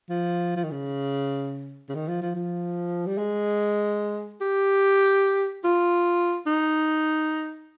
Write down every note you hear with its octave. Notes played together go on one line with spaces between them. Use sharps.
F3
F3
D#3
C#3
C#3
D#3
F3
F3
F3
G3
G#3
G4
F4
D#4